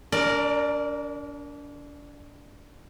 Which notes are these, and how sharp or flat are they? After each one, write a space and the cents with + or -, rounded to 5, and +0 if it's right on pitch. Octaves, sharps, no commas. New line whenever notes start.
D4 -35 A#4 +0 D5 +15